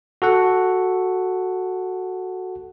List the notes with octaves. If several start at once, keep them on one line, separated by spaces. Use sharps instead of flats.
F#4 A4 F#5